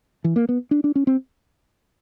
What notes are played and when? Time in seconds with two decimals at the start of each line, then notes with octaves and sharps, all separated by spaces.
0.24 E3
0.36 A#3
0.49 B3
0.71 D4
0.84 D4
0.95 C#4
1.07 C4